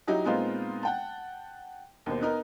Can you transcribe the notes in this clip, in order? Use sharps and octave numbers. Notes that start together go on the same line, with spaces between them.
F#3 D#4 E4 G4
A#2 G#3 B3 C4 D#4 F4
F#5 G5 A5
D#2 B2 C5
B3 D#4 A#4